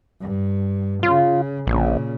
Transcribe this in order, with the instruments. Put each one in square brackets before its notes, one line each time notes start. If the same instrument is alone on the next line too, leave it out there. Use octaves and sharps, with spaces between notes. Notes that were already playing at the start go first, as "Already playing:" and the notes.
[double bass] G2
[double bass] C#3 [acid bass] F4
[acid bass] A#1 [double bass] A#2 C#3